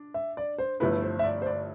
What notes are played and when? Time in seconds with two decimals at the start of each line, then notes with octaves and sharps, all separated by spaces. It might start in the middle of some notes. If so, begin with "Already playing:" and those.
Already playing: D4
0.14 E5
0.37 D5
0.58 C5
0.80 G1 G2 F3 A3 E4 B4
1.02 C5
1.19 E5
1.24 D5
1.42 C5
1.46 D5